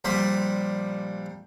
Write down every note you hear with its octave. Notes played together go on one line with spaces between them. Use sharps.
A#1 G3 B5 C6